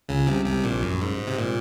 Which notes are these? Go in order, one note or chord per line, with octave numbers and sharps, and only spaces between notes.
C#2 C#3
C2 C3
C2 C3
A#1 A#2
F#2
G#2
C3
A#2